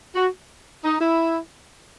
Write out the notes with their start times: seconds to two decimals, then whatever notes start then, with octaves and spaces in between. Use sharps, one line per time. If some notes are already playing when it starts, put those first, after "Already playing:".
0.15 F#4
0.84 D#4
1.00 E4